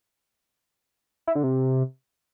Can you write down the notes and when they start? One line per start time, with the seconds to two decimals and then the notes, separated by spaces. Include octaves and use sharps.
1.27 E4
1.35 D3
1.43 C3